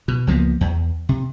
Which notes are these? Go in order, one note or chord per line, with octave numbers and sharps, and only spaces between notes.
B2
C#2 F3 A#3 B3
E2
C3